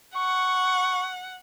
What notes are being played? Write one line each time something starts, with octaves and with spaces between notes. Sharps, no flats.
F#5 C#6